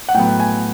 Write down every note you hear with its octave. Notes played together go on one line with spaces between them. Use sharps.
F#5
A2 F#3 B3 G5
G#5